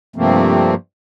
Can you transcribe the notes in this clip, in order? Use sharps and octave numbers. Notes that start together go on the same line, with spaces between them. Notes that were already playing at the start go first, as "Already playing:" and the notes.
G2 C3 F3 A3 A#3 C4